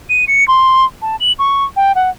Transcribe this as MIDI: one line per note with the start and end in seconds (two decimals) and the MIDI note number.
0.09 0.25 99
0.28 0.46 97
0.48 0.85 84
1.02 1.16 81
1.20 1.32 102
1.39 1.64 85
1.76 1.92 79
1.95 2.10 78